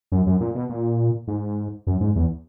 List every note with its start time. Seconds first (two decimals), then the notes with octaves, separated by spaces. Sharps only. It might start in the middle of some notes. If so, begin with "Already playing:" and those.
0.12 F#2
0.26 F#2
0.41 A#2
0.55 B2
0.69 A#2
1.27 G#2
1.87 F#2
2.00 G#2
2.15 E2